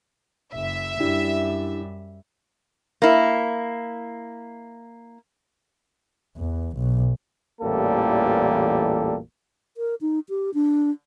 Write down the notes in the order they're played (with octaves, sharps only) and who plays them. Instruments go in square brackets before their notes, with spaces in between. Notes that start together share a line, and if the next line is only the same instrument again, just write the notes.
[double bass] F#1 [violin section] E5
[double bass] F#2 G3 [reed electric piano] D4 E4 G4
[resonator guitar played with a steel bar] A#3 E4
[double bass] E2
B1
[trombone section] A1 E2 A#2 G3 A#3 A4
[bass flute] A#4
D#4
G4
D4